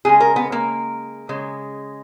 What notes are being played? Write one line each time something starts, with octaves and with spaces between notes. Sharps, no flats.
C#3 G#3 G#4
A#4
B3
A#3
C#3 G#3